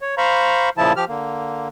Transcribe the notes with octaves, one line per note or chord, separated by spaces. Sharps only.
C#5
C5 F5 A#5 B5 C#6
A#2 C#3 F3 E4 A5
F3 G4 F6
D3 A#3